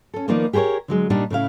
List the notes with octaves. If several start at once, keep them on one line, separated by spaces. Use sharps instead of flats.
C#4 A4
D#3 F3 A#3 B3 D#4 D5
G4 G#4 A#4 C5 C#5
D3 F#3 G#3
A#2 G3 D4 D#4 G4
A2 C#3 E4 F5